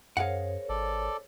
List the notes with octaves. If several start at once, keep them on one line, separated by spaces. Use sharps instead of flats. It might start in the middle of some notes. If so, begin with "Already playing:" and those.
F#2 G#4 A#4 C5 C#5 F5 F#5
G#1 A4 D5